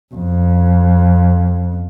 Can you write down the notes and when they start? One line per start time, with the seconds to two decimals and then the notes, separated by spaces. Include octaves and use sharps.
0.14 F2